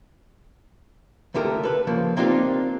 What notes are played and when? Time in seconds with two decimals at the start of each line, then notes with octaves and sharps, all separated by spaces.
1.34 C#2 D3 A3 G4 A#4
1.63 A4 B4
1.87 C#3 F3 A#3
2.17 A#3 C4 D4 D#4 F4 G4